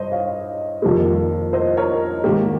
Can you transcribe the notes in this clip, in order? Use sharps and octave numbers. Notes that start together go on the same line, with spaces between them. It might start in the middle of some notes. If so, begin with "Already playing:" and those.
Already playing: G2 C5 D#5
C#5 F5
F2 D#3 G3 A#3
C5 D#5
A#4 C#5
G#2 D#3 A#3 G4